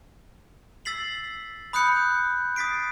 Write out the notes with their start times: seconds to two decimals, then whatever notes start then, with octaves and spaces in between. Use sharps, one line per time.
0.85 E6 A6 B6 C7 F#7
1.73 B5 D#6 F#6 G6 C#7
2.56 D#6 A6 B6 C7 D7